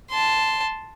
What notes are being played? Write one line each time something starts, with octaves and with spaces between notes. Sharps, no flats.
A5 C6